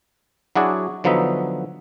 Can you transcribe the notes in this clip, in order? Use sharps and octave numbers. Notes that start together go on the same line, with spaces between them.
F#3 D4 E4 F#4 G#4 D5
D3 F3 F#3 B3 D#4 E5